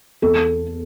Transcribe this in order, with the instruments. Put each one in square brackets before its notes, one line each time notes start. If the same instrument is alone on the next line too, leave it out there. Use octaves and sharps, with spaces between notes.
[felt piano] E2 A4